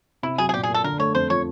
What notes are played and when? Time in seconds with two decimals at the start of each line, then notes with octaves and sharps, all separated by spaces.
0.23 C3 E4
0.38 F#3 G#4
0.49 G#4
0.53 A#2 G4
0.63 G#4
0.69 A#3
0.74 A4
0.84 D3 A#4
0.99 A3 C#5
1.15 F2 C5
1.30 F3 C#5